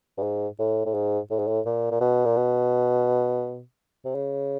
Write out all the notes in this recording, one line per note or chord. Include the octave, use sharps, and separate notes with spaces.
G2
G#2
A2
A2
G#2
A2
G#2
A2
A#2
A#2
B2
A#2
B2
C3
C#3